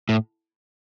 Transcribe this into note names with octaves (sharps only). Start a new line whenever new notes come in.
A2